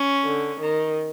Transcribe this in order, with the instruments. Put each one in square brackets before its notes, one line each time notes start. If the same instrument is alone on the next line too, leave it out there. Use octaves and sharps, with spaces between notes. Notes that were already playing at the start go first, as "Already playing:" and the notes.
Already playing: [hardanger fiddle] C#4
[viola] D3
D#3